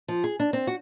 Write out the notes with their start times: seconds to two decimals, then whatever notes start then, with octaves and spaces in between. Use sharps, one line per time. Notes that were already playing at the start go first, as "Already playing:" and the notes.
0.08 F3
0.24 G#4
0.40 D4
0.53 C4
0.67 F#4